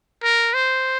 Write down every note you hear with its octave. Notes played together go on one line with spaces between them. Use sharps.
A#4
C5